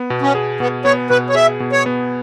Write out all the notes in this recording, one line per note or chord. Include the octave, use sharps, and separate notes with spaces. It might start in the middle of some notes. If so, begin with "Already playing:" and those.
Already playing: B3
B2
C#4
G#4
B2 B3
B3 C#5
B2 B4
C#5
G#4 E5
B2
C#5
B3